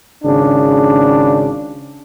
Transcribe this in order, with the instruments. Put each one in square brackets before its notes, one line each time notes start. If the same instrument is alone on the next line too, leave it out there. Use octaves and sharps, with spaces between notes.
[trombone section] G#1 C#3 D4